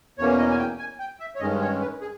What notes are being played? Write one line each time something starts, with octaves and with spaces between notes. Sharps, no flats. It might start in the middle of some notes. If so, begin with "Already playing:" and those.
E2 B2 A#3 C#4 C#5
D#5
G#5
G5
G#5
G5
E5
C#5
G2 D#3 G#3 C#4 D#5
C#5
B4
G#4